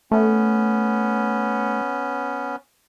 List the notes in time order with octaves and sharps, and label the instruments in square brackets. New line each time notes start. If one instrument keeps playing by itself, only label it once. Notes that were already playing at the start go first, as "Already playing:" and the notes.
[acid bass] A3 [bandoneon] B3 C#4